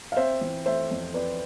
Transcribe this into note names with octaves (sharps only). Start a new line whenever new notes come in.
F5
C4 C5 E5
E3
A3 C5 E5
F2
C4 B4 D5